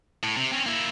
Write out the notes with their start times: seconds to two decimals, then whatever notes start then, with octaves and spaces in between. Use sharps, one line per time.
0.23 A2
0.37 C3
0.52 C4 C#4
0.66 A#3 E4